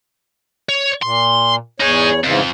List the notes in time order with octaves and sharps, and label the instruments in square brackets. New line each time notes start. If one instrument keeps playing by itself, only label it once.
[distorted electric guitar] C#5
[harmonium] A#2 [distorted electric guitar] C6
[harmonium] E2 C#5 [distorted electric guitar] D#4 G#4
[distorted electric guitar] F2 [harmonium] G#2 C#3 E3